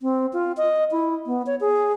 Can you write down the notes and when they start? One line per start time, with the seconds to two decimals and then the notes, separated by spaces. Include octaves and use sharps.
0.02 C4
0.33 F4
0.57 D#5
0.91 E4
1.26 B3
1.47 C#5
1.61 G#4